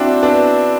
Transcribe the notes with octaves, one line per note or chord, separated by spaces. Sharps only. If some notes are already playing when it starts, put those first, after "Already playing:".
Already playing: C4 D4 E4 F#4
B3 D4